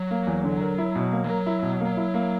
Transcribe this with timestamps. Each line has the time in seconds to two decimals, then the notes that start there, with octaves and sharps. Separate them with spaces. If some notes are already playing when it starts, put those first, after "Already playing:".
Already playing: F#3
0.11 A#3
0.27 E2
0.44 D3
0.61 A#4
0.78 E4
0.95 B2
1.12 A#3
1.24 E3
1.28 F#3 A#4
1.46 E4
1.62 B2
1.80 A#3
1.97 E4
2.14 A#3